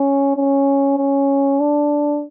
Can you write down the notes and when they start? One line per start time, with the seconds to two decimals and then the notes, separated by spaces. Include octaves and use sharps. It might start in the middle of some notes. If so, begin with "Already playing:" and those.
Already playing: C#4
0.36 C#4
0.98 C#4
1.60 D4